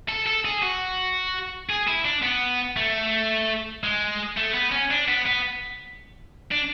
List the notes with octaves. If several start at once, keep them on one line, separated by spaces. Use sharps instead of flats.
A4
A4
G#4
F#4
G#4
E4
D4
B3
A3
G#3
A3
B3
C#4
D4
B3
B3
D4